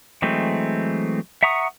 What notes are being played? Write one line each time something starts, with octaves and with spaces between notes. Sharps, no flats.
E3 F#3 G#3 A3 C4
E5 F#5 A#5 C#6 D#6